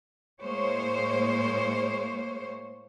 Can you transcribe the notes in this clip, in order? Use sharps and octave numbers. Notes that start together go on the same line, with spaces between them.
A2 G#3 A#3 C5 C#5